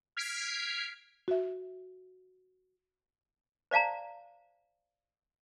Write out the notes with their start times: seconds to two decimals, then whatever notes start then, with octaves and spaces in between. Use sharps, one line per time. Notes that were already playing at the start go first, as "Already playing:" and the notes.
0.17 F6 G#6 B6 C7 D7
1.28 F#4 E5
3.71 C5 D5 F5 A5 A#5